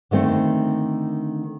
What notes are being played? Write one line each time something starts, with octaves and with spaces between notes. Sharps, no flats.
D3 D#3 A3 C4